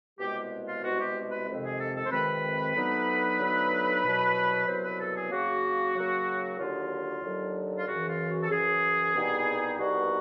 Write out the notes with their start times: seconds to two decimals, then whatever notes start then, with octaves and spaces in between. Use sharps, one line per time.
0.19 C2 B2 G#3 G4
0.68 F4
0.83 C2 B2 G#3 F#4
0.99 G4
1.31 B4
1.47 F2 C3 D#3 G#3 C4
1.63 G#4
1.79 A4
1.95 A4
2.05 C5
2.11 F2 C3 D#3 G#3 C4 B4
2.75 D2 D3 F#3 B3 D#4
3.39 D2 D3 F#3 B3 D#4
4.03 C2 B2 F#3
4.67 C2 B2 F#3 C5
4.83 B4
4.99 A4
5.14 G#4
5.31 C#3 F#3 A#3 F#4
5.95 C#3 F#3 A#3
6.59 D#2 D3 F#3 F4
7.23 D#2 D3 F#3
7.78 F4
7.87 F#2 C#3 E3 F#4
8.08 F4
8.29 F#4
8.42 A4
8.50 F#2 C#3 E3 G#4
9.14 C2 B2 G3 B3 D#4
9.78 C2 B2 G3 B3 D#4 F#4